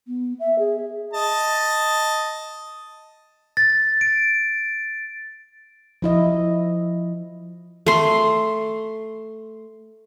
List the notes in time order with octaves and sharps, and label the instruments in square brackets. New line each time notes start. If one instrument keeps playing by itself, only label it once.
[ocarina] B3
E5
G#4
[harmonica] D#5 A5
[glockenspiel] A6
D7
[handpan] F3 E4 D#5
[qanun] A3 C6